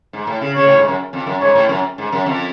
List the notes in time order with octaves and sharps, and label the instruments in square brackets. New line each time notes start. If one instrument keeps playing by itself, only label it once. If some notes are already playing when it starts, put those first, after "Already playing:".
[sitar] G#2
A2
C#3
[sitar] C#3 [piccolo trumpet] C#5
[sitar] A2
G#2
F#2
F2
F#2
[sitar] G#2 [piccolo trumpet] C#5
[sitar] A2
F#2
G#2
F#2
F2